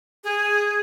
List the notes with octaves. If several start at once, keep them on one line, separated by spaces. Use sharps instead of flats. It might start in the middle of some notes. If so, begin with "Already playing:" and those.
G#4